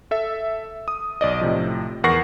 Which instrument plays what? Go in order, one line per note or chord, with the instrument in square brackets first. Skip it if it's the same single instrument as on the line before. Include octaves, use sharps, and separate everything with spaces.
[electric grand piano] A4 E5
D#6
B1 D5 D#5
A2 C3 F3
E2 A#4 F#5 C#6 A#6 C7